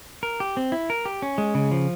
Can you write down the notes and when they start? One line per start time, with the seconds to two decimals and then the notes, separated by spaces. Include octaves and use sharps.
0.23 A#4
0.40 G4
0.57 C4
0.72 E4
0.90 A#4
1.05 G4
1.22 C#4
1.38 G#3
1.55 C#3
1.71 F3